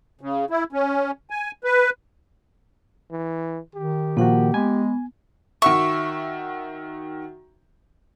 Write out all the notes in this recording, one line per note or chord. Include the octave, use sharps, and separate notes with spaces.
C#3
E4
C#4
G#5
B4
E3
D#3 G4
A#2 F3 A#3 F#4 F#5
G#3 B3 G#5
D#3 F#4 E5 C#6